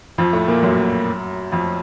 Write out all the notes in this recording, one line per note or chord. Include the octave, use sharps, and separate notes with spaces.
F2 F3
A2 A3
A#2 A#3
F#2 F#3
F2 F3